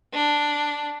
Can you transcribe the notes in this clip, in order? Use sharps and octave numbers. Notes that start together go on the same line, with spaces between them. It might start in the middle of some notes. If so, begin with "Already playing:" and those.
D4